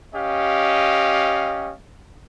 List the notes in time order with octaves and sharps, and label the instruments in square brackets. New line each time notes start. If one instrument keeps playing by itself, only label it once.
[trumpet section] C#4 G4 D#5 F5